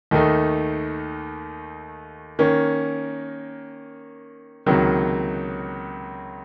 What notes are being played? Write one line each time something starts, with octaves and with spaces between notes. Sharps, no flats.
D#2 D#3 A3 D#4
D#3 A#3 C#4
C#2 C3 D#3 F#3 A#3